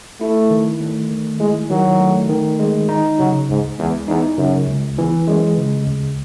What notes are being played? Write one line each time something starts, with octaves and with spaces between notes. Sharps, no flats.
A3 E4
D#3
A3
D#3
G#3 E4
D#3 F#3
A3
D#3
G#3
D#4
C#3 F#3
C#2 G#2
E2 G#3
E2 D#4
F#2 C#3
C#2
E2 E3
F#2 G#3
C#3
C#2